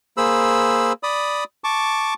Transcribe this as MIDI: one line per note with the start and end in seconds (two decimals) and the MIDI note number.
0.17 0.93 58
0.17 0.93 68
0.17 0.93 72
0.17 0.93 83
0.17 0.93 88
1.03 1.44 74
1.03 1.44 83
1.03 1.44 87
1.64 2.14 81
1.64 2.14 85
1.64 2.14 86